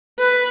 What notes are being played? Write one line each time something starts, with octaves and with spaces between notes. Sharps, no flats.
B4